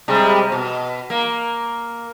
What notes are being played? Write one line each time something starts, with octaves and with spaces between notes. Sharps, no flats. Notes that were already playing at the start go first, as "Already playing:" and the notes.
C3 G3 G#3
B2
A#3